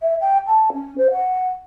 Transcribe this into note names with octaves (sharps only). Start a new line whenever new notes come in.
E5
G5
A5
C#4
C5
F#5